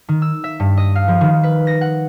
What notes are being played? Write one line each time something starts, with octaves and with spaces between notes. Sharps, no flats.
D#3
E6
E5
G2
D#5
F5
F3
D#3
B4
A#6
F#5